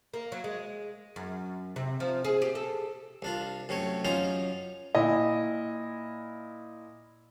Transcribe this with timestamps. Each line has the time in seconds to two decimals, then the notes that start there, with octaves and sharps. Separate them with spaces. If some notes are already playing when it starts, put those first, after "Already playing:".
0.14 A#3
0.32 F#3
0.44 G#3
1.16 F#2
1.76 C3
2.00 F3
2.24 G#4
2.42 G4
2.55 A4
3.22 C2 D4 F4
3.69 F#2 C3 A3 C#5
4.05 F#2 C#4 D#4 F4 C5 A#5
4.95 A#2 E4 D#5